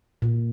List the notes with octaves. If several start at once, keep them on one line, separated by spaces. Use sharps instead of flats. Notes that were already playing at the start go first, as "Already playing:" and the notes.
A#2